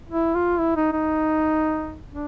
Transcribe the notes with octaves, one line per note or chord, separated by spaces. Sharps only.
E4
F4
E4
D#4
D#4
D4